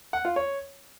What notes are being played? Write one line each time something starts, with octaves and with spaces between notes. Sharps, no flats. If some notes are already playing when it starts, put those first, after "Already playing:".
F#5
F4
C#5